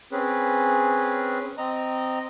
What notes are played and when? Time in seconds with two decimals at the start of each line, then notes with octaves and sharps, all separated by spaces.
0.12 C4 C#4 G#4 B4
1.58 C4 D#5 A#5